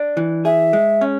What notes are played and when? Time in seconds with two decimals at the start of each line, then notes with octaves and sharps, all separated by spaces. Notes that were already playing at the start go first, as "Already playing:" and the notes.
Already playing: D4
0.17 E3
0.45 G#4 E5
0.73 G#3
1.01 C#4